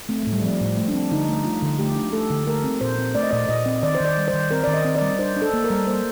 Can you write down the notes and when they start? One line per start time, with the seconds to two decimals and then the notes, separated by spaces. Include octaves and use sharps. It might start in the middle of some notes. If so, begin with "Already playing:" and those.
0.09 A3 C4
0.23 A2 A3
0.33 G3
0.43 F3 C4
0.61 A2
0.77 A3
0.88 D4
0.94 C4
1.11 D3 D#4
1.29 A3
1.44 A3 F4
1.62 D3
1.79 A3 G4
1.95 D4
2.13 A3 A4
2.30 D3
2.47 A3 A#4
2.64 C4
2.81 A#2 C5
2.98 C4
3.15 A3 D5
3.23 D#5
3.31 A#2 D5
3.49 A#2 D#5
3.66 C4
3.82 D#3 D5
3.95 C5
4.00 D#3 D5
4.17 G3
4.28 C5
4.33 D#3
4.51 C4 A#4
4.64 D#3 D5
4.74 D#5
4.85 C4
4.96 D5
5.01 G3
5.19 D4 C5
5.36 D4
5.42 A4
5.53 A#3
5.64 A#4
5.70 G3
5.87 A#3 C5